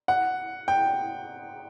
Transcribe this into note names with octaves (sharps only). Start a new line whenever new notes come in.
F#5
G5